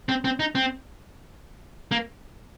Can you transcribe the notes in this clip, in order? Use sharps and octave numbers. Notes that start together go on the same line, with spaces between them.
C4
C4
D#4
C4
A#3